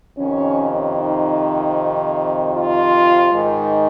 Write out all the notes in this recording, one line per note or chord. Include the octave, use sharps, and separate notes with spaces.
F2 C3 D#3 C#4
D#4
F4
G#2 D#3